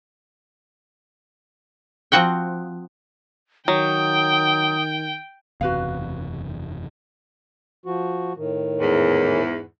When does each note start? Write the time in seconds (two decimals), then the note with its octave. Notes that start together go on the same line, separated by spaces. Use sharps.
2.12 F3 C4 F#4 F#5 G5
3.68 D#3 F#3 G5 D#6
5.61 F#1 E2 C3 F#4 B4 F5
7.86 F3 F#4
8.37 A2 D#3
8.80 E2 G#2